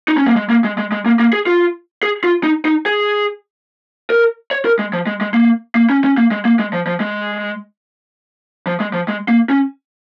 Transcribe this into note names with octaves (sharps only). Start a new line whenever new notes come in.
D#4
C#4
A#3
G#3
A#3
G#3
G#3
G#3
A#3
A#3
G#4
F4
G#4
F4
D#4
D#4
G#4
A#4
C#5
A#4
G#3
F3
G#3
G#3
A#3
A#3
C#4
C#4
A#3
G#3
A#3
G#3
F3
F3
G#3
F3
G#3
F3
G#3
A#3
C#4